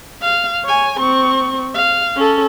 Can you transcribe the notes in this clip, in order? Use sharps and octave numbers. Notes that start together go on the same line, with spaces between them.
F5
C#5 G#5
C4 C#6
F5
C#4 A4